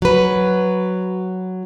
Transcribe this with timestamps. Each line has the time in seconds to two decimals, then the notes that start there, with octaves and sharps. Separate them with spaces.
0.02 F#3 B4